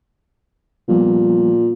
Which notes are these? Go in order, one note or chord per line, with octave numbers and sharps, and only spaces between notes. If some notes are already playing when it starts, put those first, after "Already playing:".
A#2 F3 G3 B3